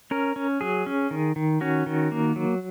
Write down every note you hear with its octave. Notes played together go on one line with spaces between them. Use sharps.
C#4 A#4
C#4
F#3 G#4
C#4
D#3
D#3
C#4 F#4
D#3
A#3
F#3